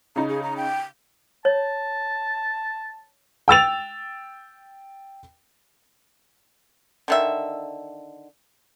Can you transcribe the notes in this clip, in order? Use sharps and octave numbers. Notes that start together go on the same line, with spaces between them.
C#3 D#4 A#5
G#4
A#5
G5
C#5 A5
G5 E6 A6 F7
D3 D#3 E5